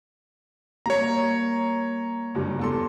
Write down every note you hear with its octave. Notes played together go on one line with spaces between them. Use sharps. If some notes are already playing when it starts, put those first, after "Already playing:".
G3 A#3 C#5 A#5
F#1 G2 G3
E2 A4 C6